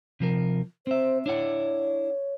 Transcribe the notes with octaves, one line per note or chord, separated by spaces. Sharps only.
C3 F3 A#4
C4 C5 E5
D4 E4 C#5 F#5